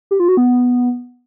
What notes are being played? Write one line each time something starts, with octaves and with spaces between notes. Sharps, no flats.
G4
F4
F#4
B3